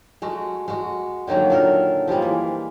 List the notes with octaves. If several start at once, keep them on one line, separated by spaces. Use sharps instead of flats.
G#3 A3 F#4
G#3 F#4
D3 D#3 F#3 A#3
A#2 A4 A#4
F3 G3 G#3 A#3
E3